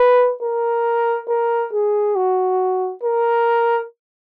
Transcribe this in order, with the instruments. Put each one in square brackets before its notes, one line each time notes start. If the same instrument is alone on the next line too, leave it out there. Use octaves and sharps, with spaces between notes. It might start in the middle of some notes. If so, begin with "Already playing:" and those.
Already playing: [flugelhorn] B4
A#4
A#4
G#4
F#4
A#4